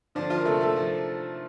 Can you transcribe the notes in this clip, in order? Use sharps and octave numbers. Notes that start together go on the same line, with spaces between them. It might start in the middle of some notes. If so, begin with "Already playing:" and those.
D3 F3 D4
F3 F4
A#4
C3 A3 A4
A3 A4
F3